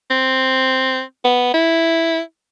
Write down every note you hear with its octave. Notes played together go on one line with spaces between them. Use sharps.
C4
B3
E4